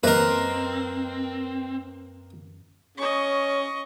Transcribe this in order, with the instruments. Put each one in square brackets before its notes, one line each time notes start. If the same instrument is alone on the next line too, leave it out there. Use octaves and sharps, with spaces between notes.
[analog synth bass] F#2 [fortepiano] A#3 D#5 [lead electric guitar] C4 [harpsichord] A#4 B4
[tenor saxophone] C#4 [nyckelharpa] D#5 C#6